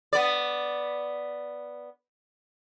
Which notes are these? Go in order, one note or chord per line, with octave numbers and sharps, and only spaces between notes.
B3 D5